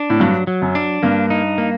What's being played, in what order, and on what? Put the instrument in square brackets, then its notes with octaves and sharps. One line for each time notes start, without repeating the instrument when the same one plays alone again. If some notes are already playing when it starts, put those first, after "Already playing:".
Already playing: [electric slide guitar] D4
[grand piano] A2
[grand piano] G2 [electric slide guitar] F#3
[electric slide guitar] F#3
[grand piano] F#2
[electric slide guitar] D4
[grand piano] G2 [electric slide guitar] A#3
[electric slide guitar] D#4
A#3